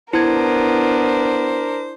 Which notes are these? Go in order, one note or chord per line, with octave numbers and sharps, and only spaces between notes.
B3 D4 E4 A#4 C5 G#6